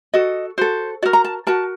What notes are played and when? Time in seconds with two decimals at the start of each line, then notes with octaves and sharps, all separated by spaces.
0.13 F#4 A4 D#5
0.58 F#4 A4 C5
1.02 F#4 A#4 D5
1.13 A#5
1.24 A5
1.47 F#4 A#4 A5